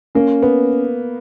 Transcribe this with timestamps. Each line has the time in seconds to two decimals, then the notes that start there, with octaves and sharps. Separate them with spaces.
0.15 A#3 C#4
0.43 B3